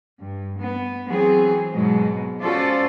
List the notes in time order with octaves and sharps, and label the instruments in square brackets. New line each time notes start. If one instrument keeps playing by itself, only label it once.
[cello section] G2
B3
E3 F#3 B3 C4 G#4
G#2 B2 F#3 G#3
C#4 F4 F#4 A4 C5 D5